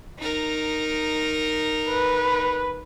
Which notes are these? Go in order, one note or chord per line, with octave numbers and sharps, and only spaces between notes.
D#4 A#4
B4